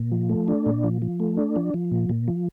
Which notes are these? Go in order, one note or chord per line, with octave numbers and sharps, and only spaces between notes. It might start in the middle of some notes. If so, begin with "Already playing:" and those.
Already playing: A#2
F3
A3
D4
A#2
F3
F3
A3
D4
F3
F3
A#2
A#2
F3